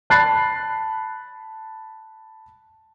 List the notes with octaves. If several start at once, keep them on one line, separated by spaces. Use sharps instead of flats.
A5 B5 F#6 A6 C7